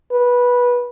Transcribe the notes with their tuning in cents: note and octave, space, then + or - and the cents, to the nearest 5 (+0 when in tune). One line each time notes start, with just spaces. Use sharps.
B4 -15